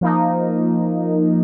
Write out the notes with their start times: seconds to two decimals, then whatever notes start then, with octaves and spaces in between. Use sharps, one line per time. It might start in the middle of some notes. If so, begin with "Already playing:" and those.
0.01 F3 A#3 D#4